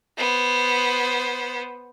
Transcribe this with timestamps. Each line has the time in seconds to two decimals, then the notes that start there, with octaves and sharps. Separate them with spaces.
0.17 B3 C5